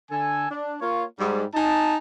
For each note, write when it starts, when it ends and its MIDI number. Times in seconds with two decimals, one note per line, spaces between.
0.11 0.46 50
0.11 0.46 69
0.11 0.46 80
0.50 0.76 62
0.81 1.04 58
0.81 1.04 65
0.81 1.04 73
1.19 1.44 44
1.19 1.44 55
1.55 1.96 63
1.55 1.96 80
1.55 1.96 81